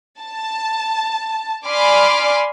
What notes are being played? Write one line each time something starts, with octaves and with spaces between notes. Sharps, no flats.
A5
D5 G#5 B5 C6 D6 F6